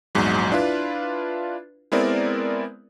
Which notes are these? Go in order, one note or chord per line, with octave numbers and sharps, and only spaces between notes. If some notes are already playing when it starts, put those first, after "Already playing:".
A#1 E2 G#2 F#3
D4 E4 F4 B4
G#3 B3 C4 E4 A#4 D5